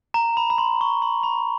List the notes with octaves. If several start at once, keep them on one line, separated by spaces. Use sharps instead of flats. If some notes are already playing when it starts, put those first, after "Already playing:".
A#5
B5
B5
C6
C#6
C6
B5